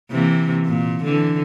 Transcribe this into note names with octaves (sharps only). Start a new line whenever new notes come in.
C3 E3 A#3
A#2
D3 E3